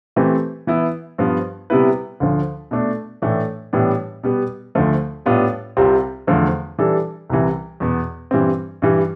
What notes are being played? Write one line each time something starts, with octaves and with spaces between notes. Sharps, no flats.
E3 A3 C4 G4 B4
E3 B3 E4
G2 F3 B3
C3 G3 B3 E4 B4
D2 D3 F3
B2 A3 D4
A2 E3 A3 D4
A2 E3 G3 B3 D4
B2 G3 B3
D2 D3 F3 A3
A2 G3 B3 D4 F4
C2 C3 G3 C4 F4
E2 D3 F3 A3
E3 G3 D4 A4
C2 C3 E3
E2 B2 B3
G2 E3 G3 C4
G2 E3 G3